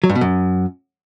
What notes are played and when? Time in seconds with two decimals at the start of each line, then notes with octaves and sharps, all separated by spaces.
0.04 F#3
0.09 G2
0.15 B2
0.21 F#2